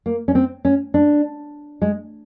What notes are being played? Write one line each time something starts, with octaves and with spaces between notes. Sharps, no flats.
A#3
C#4
C4
C#4
D4
G#3